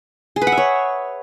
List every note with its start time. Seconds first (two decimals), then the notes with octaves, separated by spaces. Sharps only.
0.36 G#4
0.42 B4
0.47 F#5
0.52 E5
0.58 C#5